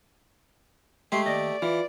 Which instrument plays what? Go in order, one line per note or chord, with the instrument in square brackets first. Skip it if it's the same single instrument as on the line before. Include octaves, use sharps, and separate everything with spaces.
[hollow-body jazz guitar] G#3 [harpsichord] A3 G4 [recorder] C6
[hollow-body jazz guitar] D#2 D#5 [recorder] D5
[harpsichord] E3 [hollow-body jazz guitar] F4